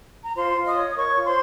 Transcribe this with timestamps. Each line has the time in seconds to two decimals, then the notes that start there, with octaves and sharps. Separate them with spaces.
0.24 A#5
0.36 F4 C5 C6
0.57 F4
0.66 D#5 D#6
0.75 C#5
0.90 D#6
0.96 A#4 C#5 C#6
1.16 F4
1.26 C5 C6